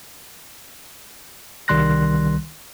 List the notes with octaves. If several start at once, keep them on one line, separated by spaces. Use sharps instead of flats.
C2 D#3 G3 C6 F#6 A#6